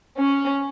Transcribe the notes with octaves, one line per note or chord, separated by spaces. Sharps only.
C#4